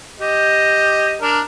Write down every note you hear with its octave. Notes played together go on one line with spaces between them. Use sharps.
G4 D#5
D4 A#4